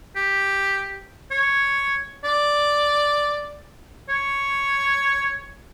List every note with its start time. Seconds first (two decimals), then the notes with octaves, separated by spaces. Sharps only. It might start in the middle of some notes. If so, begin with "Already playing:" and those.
0.16 G4
1.31 C#5
2.24 D5
4.09 C#5